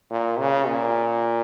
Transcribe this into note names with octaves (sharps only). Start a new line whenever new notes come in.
A#2
C#3
A#2